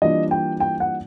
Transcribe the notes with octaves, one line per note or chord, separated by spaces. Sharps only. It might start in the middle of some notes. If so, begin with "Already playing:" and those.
E3 G3 A#3 D4 F4 D#5
G5
G5
F#5